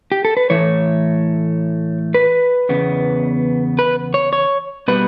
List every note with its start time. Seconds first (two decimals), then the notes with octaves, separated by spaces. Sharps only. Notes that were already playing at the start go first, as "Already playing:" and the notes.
0.12 G4
0.25 A4
0.37 B4
0.50 A2 E3 A3 C#5
2.14 B4
2.69 E2 C#3 B3
3.79 B4
4.14 C#5
4.33 C#5
4.88 B2 G3 B3 B4